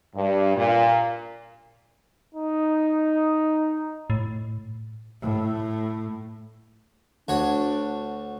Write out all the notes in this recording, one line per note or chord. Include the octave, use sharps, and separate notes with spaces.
G2
A#2
D#4
A2
A2
D2 D4 F#4 C#5